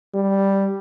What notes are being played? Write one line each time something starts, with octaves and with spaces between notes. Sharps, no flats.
G3